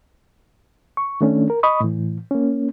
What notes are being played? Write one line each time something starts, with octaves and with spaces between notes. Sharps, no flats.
C#6
D#3 A3 C#4 D4
A#4
D#5 B5 C#6 D#6
A2 E3
A#3 C#4